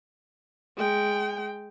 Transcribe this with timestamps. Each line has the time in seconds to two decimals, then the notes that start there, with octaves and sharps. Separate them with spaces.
0.77 G#3 G5